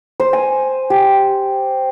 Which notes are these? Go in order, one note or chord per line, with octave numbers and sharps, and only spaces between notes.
C5
G#5
G4